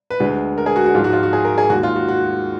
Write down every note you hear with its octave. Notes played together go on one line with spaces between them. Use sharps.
B4
D2 D3 G#3
A#4
G#4
F#4
F#4
G#2 F3 G#3 F4
F#4
F4
F#4
G#4
A#4
G#4
D#2 D#3 G#3 F#4
F4
F#4
F#4